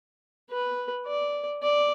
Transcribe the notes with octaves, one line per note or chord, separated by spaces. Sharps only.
B4
D5
D5